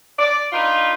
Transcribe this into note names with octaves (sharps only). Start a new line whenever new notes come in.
D5
D4 D#4 F4 B4